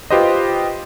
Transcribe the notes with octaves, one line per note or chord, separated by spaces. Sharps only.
F4 G4 B4 C5 D#5